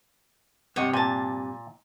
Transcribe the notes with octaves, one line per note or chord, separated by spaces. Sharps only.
G2 C3 C#5 D#5 F#5
A#2 G#5 A5